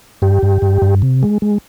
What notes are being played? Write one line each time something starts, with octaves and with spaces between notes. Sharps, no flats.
G2 G4
G2
G2
G2
C3
G#3
G#3